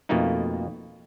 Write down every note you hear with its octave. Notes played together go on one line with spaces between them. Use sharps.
F2 B2 A3 A#3 D#4